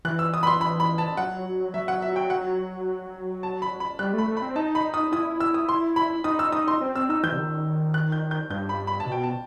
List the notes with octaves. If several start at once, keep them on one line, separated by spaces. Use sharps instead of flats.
E3 F#6
E6
D#6
B5
C6
B5
B5
A5
F#3 F#5
F#3 E5
F#5
E5
G5
F#5
A5
B5
B5
G3 F#6
A3 B5
A3
B5
C4
D#4 A5
B5
D#6
E4 D#6
E6
D#6
C6
B5
D#4 D#6
E6
D#6
C6
C4
C4 E6
D#4 E6
E3 G6
C3
D#3
F#6
G6
G6
G2 G6
B5
B5
A5
B2
G5
A5